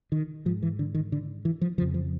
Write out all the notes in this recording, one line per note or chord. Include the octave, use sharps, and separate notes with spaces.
D#3
G#2 F3
E3
D3
D#3
D3
E3
F3
F2 C#3 F3
F3